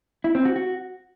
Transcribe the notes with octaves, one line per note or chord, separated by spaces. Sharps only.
E4
C4
F#4
F#4